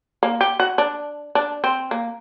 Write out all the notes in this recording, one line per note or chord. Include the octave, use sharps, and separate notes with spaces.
A#3
G4
F#4
D4
D4
C4
A#3